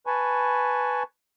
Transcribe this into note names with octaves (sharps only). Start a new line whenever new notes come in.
B4 G#5 A5 B5 C#6